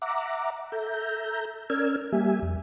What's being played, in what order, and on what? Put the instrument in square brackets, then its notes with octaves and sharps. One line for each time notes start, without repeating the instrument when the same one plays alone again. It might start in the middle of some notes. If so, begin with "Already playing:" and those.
[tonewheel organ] E5 F#5 A#5 D6
A4 E5 A#5 G6
C#4 A#4 D5 E6 F6 G#6
G3 A#3 G4 E5 G#5
F2